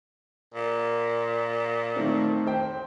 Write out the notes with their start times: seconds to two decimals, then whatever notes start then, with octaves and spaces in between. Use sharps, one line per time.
0.54 A#2
1.96 D#3 A3 C4
2.47 C5 G5